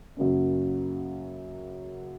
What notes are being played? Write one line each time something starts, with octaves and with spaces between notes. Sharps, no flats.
F#2 C#3 F#3 A#3 C#4